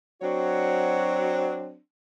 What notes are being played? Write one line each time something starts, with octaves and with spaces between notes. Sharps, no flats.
F#3 C4 D4 F#4 C#5